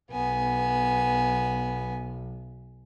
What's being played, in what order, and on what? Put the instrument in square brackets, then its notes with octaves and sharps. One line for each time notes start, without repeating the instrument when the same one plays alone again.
[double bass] B1 [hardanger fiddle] B3 G#5